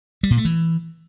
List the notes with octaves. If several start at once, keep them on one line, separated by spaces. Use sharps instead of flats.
G3
A#2
A3
E3